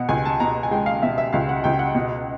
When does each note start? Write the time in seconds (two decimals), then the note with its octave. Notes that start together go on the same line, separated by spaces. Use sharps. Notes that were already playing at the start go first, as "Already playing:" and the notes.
Already playing: B2 F#5
0.09 C#2 G#5
0.25 A5
0.40 B2 A#5
0.63 G#5
0.71 G#3 G5
0.86 F5
1.02 B2 E5
1.18 E5
1.33 C#2 F5
1.49 F#5
1.64 C#2 G5
1.79 F#5
1.95 B2